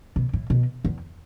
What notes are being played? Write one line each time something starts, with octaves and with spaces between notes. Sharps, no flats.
B2
A2
B2
E2